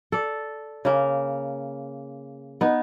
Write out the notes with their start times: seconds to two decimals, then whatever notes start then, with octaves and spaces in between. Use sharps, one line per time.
0.12 A4 D5
0.85 C#3 A#3
2.61 B3 D#4